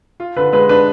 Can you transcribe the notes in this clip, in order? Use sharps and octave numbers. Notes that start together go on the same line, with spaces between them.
F4
D3 B4
G#3 B4
D4 B4